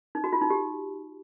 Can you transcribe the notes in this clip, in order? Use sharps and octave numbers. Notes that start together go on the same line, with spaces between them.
D#4
F#4
F4
D#4
G4